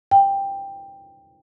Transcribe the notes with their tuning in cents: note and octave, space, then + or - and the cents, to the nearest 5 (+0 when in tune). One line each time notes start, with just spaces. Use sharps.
G5 +10